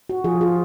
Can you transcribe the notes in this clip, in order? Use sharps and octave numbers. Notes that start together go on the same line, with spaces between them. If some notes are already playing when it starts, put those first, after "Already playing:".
F#4
F3 F4 G#4
F4 G#4